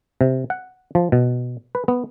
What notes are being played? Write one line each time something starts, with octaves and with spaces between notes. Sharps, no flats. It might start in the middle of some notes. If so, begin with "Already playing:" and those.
C3
F#5
F3
B2
B4
B3